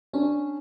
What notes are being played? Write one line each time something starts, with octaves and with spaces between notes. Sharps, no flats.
C#4 D4